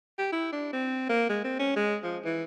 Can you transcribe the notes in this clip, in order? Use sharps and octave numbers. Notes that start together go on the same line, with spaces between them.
G4
E4
D4
C4
A#3
G#3
C4
C#4
G#3
F3
E3